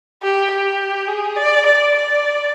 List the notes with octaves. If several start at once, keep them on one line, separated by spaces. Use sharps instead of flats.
G4
G4
G#4
D5
D5
D5